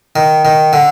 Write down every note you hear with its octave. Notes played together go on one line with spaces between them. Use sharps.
D#3
D#3
D3